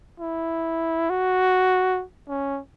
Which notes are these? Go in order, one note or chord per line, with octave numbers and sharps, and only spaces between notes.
E4
F#4
C#4